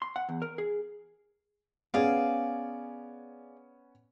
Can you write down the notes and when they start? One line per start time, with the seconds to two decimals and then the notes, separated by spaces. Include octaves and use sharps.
0.02 C6
0.16 F#5
0.29 E2
0.42 A#4
0.58 G#4
1.94 B3 C#4 G#4 D5 F5